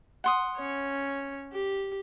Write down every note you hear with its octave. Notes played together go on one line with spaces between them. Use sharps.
F#5 C6 D#6
C#4 C#5
G4